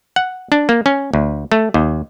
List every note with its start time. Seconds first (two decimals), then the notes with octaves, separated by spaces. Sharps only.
0.16 F#5
0.52 D4
0.69 A#3
0.86 C#4
1.14 D2
1.52 A3
1.74 D#2